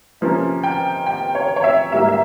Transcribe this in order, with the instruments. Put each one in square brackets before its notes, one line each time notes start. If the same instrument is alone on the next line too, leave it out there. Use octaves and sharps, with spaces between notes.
[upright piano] C3 F3 A#3 C#4
G5
G5
C#5
C#5
E5
G#2 G3 A#3 E5
E5